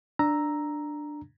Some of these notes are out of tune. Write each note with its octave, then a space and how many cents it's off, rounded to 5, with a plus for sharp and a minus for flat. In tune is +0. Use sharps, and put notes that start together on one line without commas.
D4 +10 A#5 +0 E6 +0